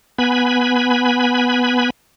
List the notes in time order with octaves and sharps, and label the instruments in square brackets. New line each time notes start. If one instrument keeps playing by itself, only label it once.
[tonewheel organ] B3 G#5 B5